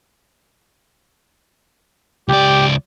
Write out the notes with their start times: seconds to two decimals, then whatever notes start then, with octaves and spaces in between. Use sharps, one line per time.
2.28 C#2 G4 D5